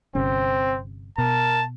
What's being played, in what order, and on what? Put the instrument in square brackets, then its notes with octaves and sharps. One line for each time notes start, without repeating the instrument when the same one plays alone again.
[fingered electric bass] G1 C3 C#4 [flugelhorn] C4
[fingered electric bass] B2 [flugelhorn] A#4 [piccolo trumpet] A5